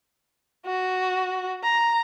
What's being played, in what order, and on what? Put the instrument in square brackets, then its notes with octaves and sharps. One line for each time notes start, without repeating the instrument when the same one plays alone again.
[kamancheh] F#4
A#5